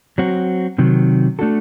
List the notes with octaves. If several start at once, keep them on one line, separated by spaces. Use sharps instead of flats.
F#3 C4 F#4
C3 D#3 F#3
A3 D4 F#4 A4